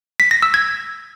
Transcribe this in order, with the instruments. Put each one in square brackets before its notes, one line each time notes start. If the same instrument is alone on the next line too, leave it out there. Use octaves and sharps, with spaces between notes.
[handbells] B6
A#6
E6
G#6